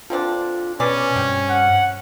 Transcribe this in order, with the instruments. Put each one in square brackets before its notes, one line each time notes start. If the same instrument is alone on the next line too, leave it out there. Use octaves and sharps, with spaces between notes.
[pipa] D3 C4 D4 [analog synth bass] F4
[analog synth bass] B2 [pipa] B3 G#4 D5 [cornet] C#4
[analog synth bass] G2 [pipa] C4
[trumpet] F#5